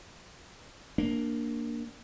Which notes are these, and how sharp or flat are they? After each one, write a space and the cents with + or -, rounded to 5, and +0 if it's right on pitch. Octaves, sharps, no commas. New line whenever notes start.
A#3 +0 D4 +0